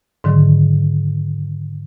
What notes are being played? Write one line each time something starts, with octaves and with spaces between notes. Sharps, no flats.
G#2 D3 D#3 F#3